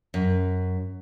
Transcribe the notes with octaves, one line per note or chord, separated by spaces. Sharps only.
F#2